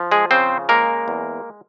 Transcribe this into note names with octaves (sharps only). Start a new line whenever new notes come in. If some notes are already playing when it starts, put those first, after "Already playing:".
Already playing: F3
G#3 G#4
C#3 C4 C5
G#3 A#3 A#4
E2